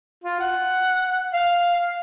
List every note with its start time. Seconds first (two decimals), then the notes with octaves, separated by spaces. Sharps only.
0.24 F4
0.40 F#5
1.33 F5